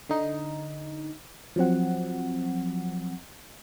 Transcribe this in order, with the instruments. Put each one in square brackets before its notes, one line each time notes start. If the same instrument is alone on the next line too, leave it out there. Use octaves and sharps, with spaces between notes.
[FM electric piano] D3 D#4
F3 F#3 C4 F#5